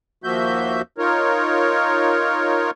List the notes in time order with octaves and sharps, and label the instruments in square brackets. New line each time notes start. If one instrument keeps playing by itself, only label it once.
[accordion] D#2 F3 A#3 F#4 E5 G6
D#4 F4 A#4 C#5